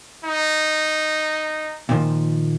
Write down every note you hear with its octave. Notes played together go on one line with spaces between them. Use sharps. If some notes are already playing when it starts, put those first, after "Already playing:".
D#4
A#2 D#3 F3